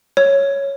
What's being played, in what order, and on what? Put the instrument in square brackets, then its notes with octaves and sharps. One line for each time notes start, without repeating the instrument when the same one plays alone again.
[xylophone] C#5